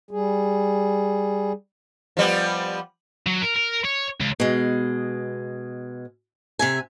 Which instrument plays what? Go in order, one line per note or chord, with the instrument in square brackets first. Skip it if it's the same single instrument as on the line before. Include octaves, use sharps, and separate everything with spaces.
[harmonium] G3 G#4
[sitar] F3 G3 B3
[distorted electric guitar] F#3
A#4
A#4
C#5
C#2
[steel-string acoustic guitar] B2 G#3
C3 E5 G#5